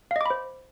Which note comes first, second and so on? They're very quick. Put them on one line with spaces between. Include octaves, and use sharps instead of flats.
F5 D#5 D6 B5 C5